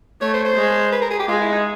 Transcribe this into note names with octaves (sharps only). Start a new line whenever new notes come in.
A3 C#5
C5
C5
G#3
B4
A#4
G#4
G4
G#3 F4
E4
D#4